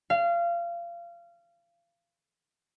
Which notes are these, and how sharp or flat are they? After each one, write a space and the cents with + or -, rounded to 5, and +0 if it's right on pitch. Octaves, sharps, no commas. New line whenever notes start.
F5 -25